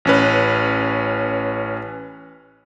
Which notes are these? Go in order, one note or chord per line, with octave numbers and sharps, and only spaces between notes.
A1 C#4 B4